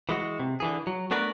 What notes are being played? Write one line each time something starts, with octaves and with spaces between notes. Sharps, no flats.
E3 G#3 F#4
C3
D3 E3 G#4
F#3
A3 B3 D4 F#4 A#4 B4